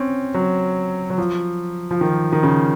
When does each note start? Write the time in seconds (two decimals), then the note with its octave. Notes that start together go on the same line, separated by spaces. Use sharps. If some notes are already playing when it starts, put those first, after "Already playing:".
Already playing: C4 C#4
0.34 F#3
1.10 F#3
1.18 F3
1.91 F3
2.01 D#3
2.32 D#3
2.43 C#3